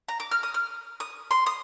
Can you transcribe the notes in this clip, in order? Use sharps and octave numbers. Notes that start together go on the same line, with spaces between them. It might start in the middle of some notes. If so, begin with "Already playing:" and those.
A#5
D6
F6
D#6
F6
D#6
C6
D#6